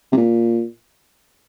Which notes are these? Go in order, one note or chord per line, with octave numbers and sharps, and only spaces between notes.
C3
A#2